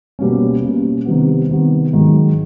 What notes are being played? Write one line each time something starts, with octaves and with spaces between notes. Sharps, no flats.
B2 G3 A#3 C#4
B2 G3 A#3 C#4
C3 D#3 G3 B3
C3 D#3 G3 B3
G#2 D#3 F#3